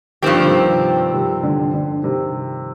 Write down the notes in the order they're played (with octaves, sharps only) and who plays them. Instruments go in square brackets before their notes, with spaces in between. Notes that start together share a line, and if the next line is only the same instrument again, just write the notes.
[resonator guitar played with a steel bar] G2 F3 C4 G4 [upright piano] D#3
[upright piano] D3
C3 D#3
C3 D#3
D3
D3
C3 D#3